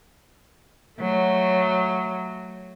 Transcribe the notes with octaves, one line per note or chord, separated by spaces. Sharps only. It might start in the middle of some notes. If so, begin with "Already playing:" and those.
F#3 A3